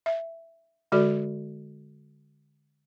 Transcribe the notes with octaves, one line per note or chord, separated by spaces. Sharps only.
E5
D3 G#3 F#4 A4 D5